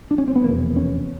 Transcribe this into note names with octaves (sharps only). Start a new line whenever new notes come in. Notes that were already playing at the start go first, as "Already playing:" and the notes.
D4
C#4
C4
B3
F1 E2 B2 A#3
C#4